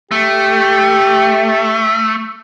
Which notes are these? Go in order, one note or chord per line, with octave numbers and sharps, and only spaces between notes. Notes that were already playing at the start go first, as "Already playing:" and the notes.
A3 G4